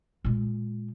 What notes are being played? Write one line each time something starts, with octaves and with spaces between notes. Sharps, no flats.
A#2 G#3